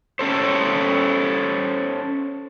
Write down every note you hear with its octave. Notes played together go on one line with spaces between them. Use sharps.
C#4 A4 C5